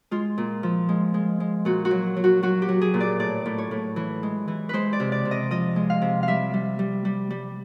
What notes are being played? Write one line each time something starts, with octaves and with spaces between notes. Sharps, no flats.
G#3 F4
A#2
F3
G#3
G#3
G#3
A#2 F#4
F#4
F#3
F#3
F#4
F#3 F#4
G4
F#3
G#4
A#2
D5
A2 D5
A2
C#5
A2
E3
G#3
E3
G#3 B4 C5
D5
C3
D5
C3
D#5
F3 D#5
G#3
F5
C3
F5
G3 E5
G3
G3
G3
G3